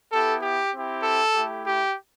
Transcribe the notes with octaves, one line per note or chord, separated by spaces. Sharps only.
B3 E4 G4 A4
G4
C4 E4 G4
A4
A3 E4 G4
G4